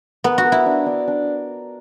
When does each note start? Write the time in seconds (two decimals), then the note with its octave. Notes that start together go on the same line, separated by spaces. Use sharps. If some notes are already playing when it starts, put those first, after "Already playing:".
0.24 B3 A#4
0.38 F#4
0.45 A#4
0.52 E4
0.66 D4
0.86 D4
1.08 D4